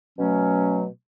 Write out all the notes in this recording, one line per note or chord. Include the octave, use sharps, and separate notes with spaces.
B2 F#3 A3 C#4